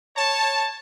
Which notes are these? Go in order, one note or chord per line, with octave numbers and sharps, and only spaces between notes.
C#5 A5